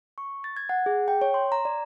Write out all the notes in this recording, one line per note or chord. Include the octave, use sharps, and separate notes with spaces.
C#6
A6
G#6
F#5
G#4
G5
C#5
C6
A#5
D5